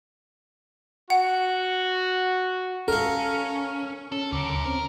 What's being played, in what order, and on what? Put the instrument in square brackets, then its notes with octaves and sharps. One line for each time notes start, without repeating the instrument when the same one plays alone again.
[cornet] F#4 [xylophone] F#5
[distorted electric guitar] C#4 [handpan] A4 [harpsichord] A#4 F5
[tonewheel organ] C#4 [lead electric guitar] A4
[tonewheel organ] D2 C#3 D6 [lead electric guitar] C#4 A#4
[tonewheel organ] C4 C#4 [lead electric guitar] A#4